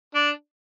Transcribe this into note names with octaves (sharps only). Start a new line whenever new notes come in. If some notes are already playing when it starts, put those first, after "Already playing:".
D4